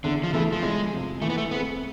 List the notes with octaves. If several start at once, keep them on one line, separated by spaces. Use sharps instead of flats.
E2 D3
F3
B2 E3 A3 E4 G#4
F3
E2 G#3
C3 F3
E3 A3
B3
A3
A3 B3 C4 G#4